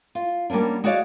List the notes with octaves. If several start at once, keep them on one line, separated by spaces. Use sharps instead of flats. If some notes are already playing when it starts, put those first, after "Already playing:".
F4
G3 A#3 B3 C#4 D4
G#3 F#4 C#5 D5 F5